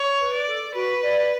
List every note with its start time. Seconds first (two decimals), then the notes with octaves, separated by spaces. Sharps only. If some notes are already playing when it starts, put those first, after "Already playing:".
Already playing: C#5
0.20 B4
0.33 D5
0.47 A4
0.74 F#4 B4
1.02 D5